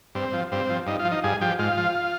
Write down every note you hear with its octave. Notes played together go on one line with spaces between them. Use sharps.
G2 C4
F3
G2 C4
F3
G2 D#4
F4
F3
D#4
G2 G#4
F3 G4
G#2 F4
F3